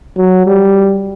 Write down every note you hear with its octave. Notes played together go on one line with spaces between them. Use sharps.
F#3
G3